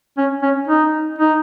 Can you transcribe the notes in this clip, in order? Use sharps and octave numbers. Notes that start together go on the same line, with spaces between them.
C#4
C#4
D#4
D#4